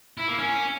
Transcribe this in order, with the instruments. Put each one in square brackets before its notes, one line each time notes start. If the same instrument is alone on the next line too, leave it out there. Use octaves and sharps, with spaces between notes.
[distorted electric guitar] E4
A#3
C#4